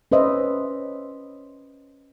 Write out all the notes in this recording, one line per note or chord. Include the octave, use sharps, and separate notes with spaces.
C#4 B4 C5 D#5 E5